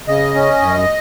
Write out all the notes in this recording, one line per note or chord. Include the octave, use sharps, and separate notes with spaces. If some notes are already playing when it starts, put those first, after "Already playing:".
C#3 D#5
C#4
F#2